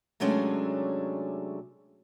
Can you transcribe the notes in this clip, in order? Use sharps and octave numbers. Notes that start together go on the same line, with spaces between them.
C3 F#3 G#3 A3 C#4 D4